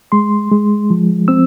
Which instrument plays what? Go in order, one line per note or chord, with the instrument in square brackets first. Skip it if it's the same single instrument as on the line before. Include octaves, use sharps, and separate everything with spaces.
[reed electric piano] G#3 C6
G#3
F3
C4 E6